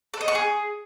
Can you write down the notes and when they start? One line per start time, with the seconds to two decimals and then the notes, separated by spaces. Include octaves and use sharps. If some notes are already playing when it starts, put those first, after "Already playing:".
0.14 A4
0.21 D#5
0.28 C#6
0.35 G#4